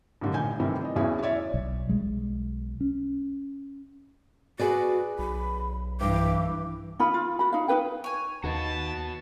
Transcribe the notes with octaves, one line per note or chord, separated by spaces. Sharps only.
A1 G2 D3 D#3
A#1 A2 D#3 G#5 G6
C3 D#3 E3 G3 A3 C4
D5 D#5
B1 E2 B2 C#4 E4 G#4
C#5 D5 E5
B1
B1 G3 G#3
C#4
F#4 G#4 B4 D5
B1 B5
G2 E3 D6
D#4 F4 B5
F4
F#4 B5
D#4 F5
D#4 G4 B4 G5
C#5 G#5
D#2 D#3 F#4 B4 A5